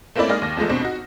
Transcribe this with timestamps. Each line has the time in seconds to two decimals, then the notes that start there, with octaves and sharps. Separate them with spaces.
0.16 A3 A#3 C4 C#4 E4 D5
0.28 G#3 A#3 D#4 G#4 D5 F6
0.42 D#2 A#6
0.57 E2 F3 G#3 A3
0.69 B2 C4 D4
0.82 D#4 F#4